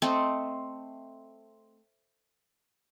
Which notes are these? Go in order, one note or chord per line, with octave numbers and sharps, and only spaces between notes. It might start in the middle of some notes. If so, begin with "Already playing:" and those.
A3 C4 D#5